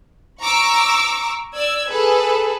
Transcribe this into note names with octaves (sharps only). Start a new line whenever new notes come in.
A#5 C#6 D6 E6
D5 E6 G#6
G#4 A4 B4